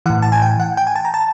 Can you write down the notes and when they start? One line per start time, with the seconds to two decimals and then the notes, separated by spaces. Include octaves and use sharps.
0.06 A2 E3 F#5
0.22 A5
0.32 G#5
0.42 G5
0.60 F#5
0.77 G5
0.87 G#5
0.96 A5
1.05 A#5
1.14 A5